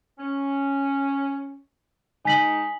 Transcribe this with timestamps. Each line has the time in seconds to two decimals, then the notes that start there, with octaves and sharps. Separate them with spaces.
0.19 C#4
2.25 G#3 D#4 G#5 B6 F#7